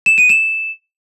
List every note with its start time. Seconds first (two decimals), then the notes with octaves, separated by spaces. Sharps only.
0.06 E7
0.18 D#7
0.29 E7